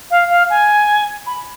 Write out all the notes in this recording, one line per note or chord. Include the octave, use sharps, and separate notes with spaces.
F5
F5
G#5
B5